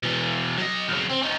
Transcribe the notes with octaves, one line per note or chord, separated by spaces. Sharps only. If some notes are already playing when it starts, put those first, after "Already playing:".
B2 E3
F#3 D#5
B1 C#3
C4
C#4 D#4